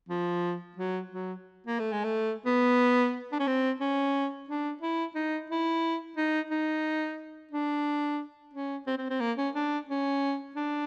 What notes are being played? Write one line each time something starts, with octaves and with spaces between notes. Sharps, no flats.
F3
F#3
F#3
A#3
A3
G#3
A3
B3
D4
C#4
C4
C#4
D4
E4
D#4
E4
D#4
D#4
D4
C#4
C4
C4
C4
A#3
C#4
D4
C#4
D4